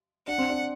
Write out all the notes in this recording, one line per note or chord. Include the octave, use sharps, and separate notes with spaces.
D4 F#5
C4
D4